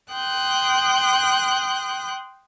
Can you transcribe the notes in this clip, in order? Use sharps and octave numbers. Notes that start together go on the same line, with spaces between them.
G5 C6 D#6 F#6 G6